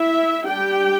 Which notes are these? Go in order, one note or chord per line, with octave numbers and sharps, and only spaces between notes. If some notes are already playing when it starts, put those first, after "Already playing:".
Already playing: E4 E5
G3 D4 G4 G5